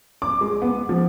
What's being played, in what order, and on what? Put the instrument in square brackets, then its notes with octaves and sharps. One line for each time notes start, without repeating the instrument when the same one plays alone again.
[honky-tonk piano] D6
G#3
B3
F3